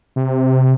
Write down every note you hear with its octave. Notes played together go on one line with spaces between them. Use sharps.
C3